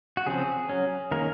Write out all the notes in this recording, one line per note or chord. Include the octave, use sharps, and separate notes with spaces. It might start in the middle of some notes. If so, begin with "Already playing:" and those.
F#4
C#3 F3 C4 G#4
F#3 C#4
D#3 A#3 C#4 A#4